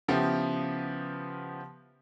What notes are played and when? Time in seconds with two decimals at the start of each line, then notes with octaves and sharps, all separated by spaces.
0.08 C#3 F3 B3 E4 G4